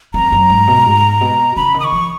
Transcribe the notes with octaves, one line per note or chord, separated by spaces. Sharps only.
F2 A#5
F#2
G#2
B2
G#2
B2
C#3 B5
D#3
D#6
C#6
F3